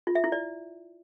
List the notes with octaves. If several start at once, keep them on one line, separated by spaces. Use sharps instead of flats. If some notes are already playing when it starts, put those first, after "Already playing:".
F4
E5
E4
D5